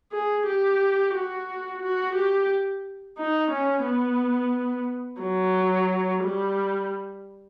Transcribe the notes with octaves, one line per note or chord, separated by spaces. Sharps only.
G#4
G4
F#4
F#4
G4
D#4
C#4
B3
F#3
G3